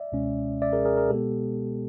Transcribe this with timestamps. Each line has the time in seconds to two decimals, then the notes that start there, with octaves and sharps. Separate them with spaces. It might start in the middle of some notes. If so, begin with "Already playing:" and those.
Already playing: D5 E5
0.12 C#2 B2 G#3 C#4
0.62 D5 E5
0.73 G#4 A#4
0.85 G#4 A#4
0.97 G#4 A#4
1.10 B2 G#3 B3 G4 A4